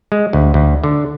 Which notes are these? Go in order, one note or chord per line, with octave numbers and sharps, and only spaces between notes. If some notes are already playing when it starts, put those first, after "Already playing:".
G#3
D2
D2
D3